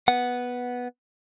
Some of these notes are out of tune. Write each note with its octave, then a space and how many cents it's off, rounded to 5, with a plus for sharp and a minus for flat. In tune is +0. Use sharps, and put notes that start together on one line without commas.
B3 -5 F#5 +0